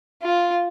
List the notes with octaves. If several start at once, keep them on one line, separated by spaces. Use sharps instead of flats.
F4